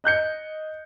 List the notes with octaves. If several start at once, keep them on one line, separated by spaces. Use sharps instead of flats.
D#5 F#6 G6 C#7